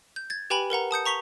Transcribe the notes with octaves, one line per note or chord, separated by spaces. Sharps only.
G6
G#6 A6
G4 B4 G5 G#5 B5 F#7
A#4 B4 F#5 A#5
A5 D#6 G6 C#7
A#5 C#6 B6 F7 G7